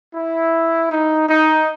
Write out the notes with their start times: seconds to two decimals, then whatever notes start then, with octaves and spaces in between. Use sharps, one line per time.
0.14 E4
0.91 D#4
1.29 D#4